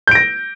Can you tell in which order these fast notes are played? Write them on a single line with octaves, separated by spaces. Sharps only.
G6 D7 A#6